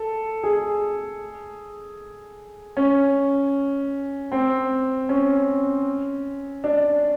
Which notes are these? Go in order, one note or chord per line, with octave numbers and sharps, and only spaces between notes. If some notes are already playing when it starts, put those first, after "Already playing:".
Already playing: A4
G#4
C#4
C4
C#4
D4